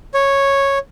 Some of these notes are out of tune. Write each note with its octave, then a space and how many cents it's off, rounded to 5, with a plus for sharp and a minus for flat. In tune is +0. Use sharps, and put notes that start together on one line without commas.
C#5 -5